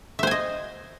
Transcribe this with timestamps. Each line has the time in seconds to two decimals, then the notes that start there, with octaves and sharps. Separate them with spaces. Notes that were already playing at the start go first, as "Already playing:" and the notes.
0.19 E5
0.23 C5
0.27 G#5
0.31 D#5